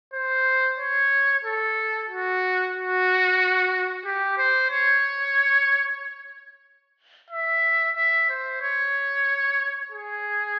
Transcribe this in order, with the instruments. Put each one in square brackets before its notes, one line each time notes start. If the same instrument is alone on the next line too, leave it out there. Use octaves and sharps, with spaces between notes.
[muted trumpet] C5
C#5
A4
F#4
F#4
G4
C5
C#5
E5
E5
C5
C#5
G#4